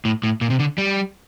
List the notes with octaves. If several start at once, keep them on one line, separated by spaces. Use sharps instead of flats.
A2
A2
A#2
C3
D3
G3